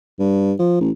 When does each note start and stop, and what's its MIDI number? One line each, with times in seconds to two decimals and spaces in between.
0.19 0.53 43
0.59 0.79 53
0.81 0.90 33